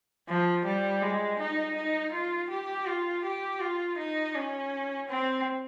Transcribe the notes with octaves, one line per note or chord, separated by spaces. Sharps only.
F3
G3
G#3
D#4
D#4
F4
G4
F4
G4
F4
D#4
C#4
C4